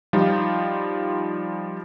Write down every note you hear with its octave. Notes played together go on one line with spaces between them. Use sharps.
F3 G3 D#4 F4